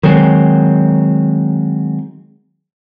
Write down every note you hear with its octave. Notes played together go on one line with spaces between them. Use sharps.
D#3 F#3 G#3 C4